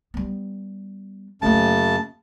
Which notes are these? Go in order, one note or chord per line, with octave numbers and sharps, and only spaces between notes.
G3 B3
F#2 C#3 A3 A#3 A5